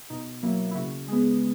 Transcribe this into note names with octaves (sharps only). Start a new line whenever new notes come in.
B2 D#4
F#3 A#3 E4
E4
C#3 F#4
G#3 B3 G#4